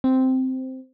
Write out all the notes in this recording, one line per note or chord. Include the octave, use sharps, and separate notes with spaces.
C4